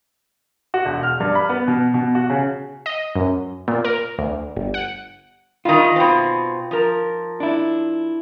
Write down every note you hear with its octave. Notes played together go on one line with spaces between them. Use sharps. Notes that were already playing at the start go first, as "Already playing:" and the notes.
F#4
E1
F6
G2
B5
B3
B2
B2
F#4
C#3
D#5
F#2
A#2
A#4
D2
G1
F#5
D#3 G3 D#4 F4
B2 C4
F3 A#4
D4 E4